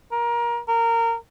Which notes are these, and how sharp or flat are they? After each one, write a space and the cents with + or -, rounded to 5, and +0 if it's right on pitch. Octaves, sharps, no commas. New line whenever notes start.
A#4 +25
A#4 -20